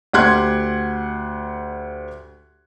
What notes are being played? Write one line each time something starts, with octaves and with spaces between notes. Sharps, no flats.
D2 G4 F#5 C6 F#6 G#6